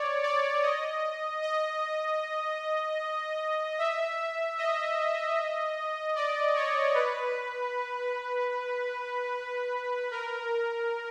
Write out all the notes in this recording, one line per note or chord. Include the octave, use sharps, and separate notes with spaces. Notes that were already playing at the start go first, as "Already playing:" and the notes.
Already playing: C#5 D5
D5
D#5
D#5
E5
D#5
D5
C#5
B4
A#4